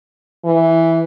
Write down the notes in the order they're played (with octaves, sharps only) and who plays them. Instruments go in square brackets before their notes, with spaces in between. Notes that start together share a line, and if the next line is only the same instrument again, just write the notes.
[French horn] E3